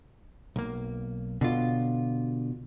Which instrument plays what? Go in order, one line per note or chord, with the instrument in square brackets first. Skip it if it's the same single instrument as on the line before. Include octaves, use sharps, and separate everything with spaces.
[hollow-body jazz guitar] B1 A#3
[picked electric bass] B2 [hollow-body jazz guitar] D3 F4